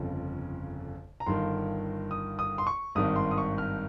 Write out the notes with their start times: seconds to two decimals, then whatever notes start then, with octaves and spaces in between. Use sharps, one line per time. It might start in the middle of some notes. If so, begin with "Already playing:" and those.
Already playing: G1 F2 C#3
1.20 A#5
1.26 G1 G2 D#3 C6
2.11 D#6
2.39 D#6
2.58 C6
2.67 C#6
2.95 G#1 G2 D#3 D#6
3.16 C6
3.31 D#6
3.38 C#6
3.58 F6